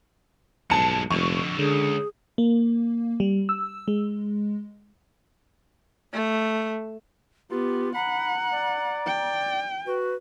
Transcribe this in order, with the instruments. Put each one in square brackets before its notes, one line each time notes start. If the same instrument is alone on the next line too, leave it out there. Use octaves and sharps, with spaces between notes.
[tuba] B1 [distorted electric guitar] G2 G#3 [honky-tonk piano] A5 C#7
[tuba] F1 [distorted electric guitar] F2 D3 [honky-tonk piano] C#6
[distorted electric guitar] C#2 [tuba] D3 [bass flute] G#4
[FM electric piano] A#3
G3
E6
G#3
[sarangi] A3
[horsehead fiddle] B3 [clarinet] F4 [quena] G4
[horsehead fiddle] F#5 [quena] A#5 [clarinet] B5
[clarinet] D5
[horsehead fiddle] G5
[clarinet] F#4 [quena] B4